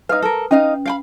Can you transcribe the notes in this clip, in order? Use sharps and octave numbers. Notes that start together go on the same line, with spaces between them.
D#4 B4 F5 D#6
A4 A#4
C#4 D#4 D#5 F5
F5 G5 B5